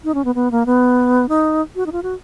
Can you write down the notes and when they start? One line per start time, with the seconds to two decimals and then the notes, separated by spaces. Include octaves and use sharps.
0.04 D#4
0.14 C#4
0.25 B3
0.35 B3
0.51 A#3
0.66 B3
1.29 D#4
1.76 F#4
1.86 D#4
1.92 F4
2.03 F#4